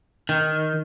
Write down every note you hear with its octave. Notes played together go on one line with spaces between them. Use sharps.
D#3